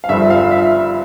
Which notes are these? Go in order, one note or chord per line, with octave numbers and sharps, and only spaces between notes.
F5
G1 G2 F3 E5
F5
E5